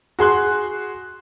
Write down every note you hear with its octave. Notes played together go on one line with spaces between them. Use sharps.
F#4 G#4 C6 F#6